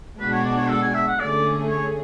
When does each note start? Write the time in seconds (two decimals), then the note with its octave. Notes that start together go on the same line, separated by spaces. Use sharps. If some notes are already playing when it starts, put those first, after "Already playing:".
0.20 B2 G#3 D4 F#4 B4
0.33 C#5
0.45 D5
0.57 C#5
0.69 A4
0.82 G#5
0.94 E5
1.08 F#5
1.19 D3 A3 C#4 G#4 D5
1.69 C#5